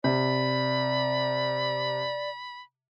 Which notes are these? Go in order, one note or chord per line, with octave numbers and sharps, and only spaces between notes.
C3 D5 B5